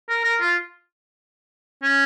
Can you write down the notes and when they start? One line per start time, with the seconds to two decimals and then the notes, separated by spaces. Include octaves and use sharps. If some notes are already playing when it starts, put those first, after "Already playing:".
0.09 A#4
0.24 A#4
0.41 F4
1.83 C#4